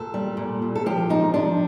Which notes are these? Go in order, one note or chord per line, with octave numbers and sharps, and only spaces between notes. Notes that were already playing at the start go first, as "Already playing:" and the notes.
Already playing: A#2 A4
G3
A#2
A#2
A4
F3 G4
F3 D#4
F3 D4